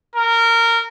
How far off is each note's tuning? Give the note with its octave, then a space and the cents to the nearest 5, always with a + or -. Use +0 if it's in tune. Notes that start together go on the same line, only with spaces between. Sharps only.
A#4 -20